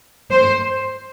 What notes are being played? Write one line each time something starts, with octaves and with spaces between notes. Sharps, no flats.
C5